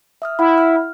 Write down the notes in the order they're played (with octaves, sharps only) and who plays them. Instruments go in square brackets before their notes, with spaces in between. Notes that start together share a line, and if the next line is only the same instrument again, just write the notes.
[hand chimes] E5 D#6 F6
[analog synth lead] E4 [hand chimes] E5 F#5 B5
[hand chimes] F6